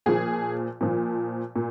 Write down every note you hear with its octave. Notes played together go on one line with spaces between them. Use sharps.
A#2 F3 G#4
A#2 F3
A#2